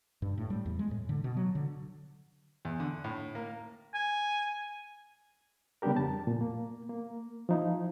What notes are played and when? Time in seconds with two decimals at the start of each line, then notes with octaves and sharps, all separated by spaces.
0.22 G2
0.38 A2
0.50 G3
0.66 E2
0.79 G#3
0.91 A2
1.09 D3
1.24 B2
1.37 F#3
1.55 D3
2.65 E2
2.80 D3
3.04 A2
3.35 A#3
3.94 G#5
5.82 C#3 G3 B3 D4 G4 A#4
5.97 F2 A5
6.27 A#2
6.41 A#3
6.89 A#3
7.49 F3 D#4 E4